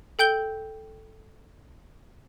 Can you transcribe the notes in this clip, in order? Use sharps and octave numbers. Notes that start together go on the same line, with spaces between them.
A4 G5 G6 G7